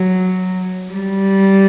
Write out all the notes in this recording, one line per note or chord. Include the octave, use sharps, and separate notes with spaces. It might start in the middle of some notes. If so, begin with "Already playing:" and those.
Already playing: F#3
G3